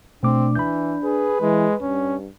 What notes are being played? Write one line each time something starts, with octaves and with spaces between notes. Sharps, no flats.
B2 A3 C4 D4 D6
E3 B5 G6
G#4 B4
E3 G#3
G2 C#4